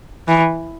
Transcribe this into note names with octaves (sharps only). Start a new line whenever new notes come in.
E3